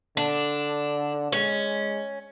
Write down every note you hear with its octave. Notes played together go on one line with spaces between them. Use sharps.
D3 D4
G#3 C#4